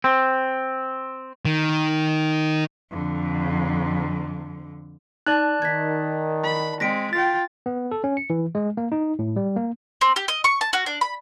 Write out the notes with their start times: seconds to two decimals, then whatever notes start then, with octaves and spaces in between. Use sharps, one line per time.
0.04 C4
1.45 D#3
2.91 F2 D3
5.27 D#4 D5 A5 F#6 F#7
5.62 D#3 G#6 B6
6.44 B5
6.80 G#3 C4 A#6 B6 D7
7.13 F4 G5 A6
7.66 B3
7.91 A4
8.04 C#4
8.17 C#7
8.30 E3
8.55 G#3
8.77 A#3
8.92 D#4
9.19 A2
9.36 G3
9.56 A#3
10.01 C4
10.16 G4
10.28 D#5
10.44 C#6
10.61 A5
10.73 F#4
10.86 D4
11.01 B5